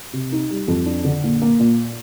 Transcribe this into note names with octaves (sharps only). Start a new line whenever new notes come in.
C3
D#4
G3
F2
D4
D3
A#1
A#3
A#2